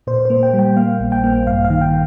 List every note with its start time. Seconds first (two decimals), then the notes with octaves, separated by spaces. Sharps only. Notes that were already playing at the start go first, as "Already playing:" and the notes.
0.07 A#2 C5
0.25 A#3 C5
0.43 G5
0.53 G3
0.59 G5
0.76 A#3 F5
1.00 A#1
1.12 G5
1.24 A#3
1.47 G2 F5
1.64 F5
1.70 D#3
1.81 G5